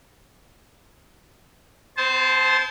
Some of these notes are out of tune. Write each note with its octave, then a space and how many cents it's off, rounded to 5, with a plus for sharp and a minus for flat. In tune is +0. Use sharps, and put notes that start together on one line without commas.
C4 -45 C5 +0 A5 -30